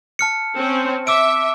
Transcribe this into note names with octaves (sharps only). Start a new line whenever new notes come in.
A5 F6 C#7
C4 C#4
E5 D6 E6 D7